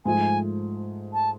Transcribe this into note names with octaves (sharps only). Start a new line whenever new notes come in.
G#2 F3 A3 G#5
A5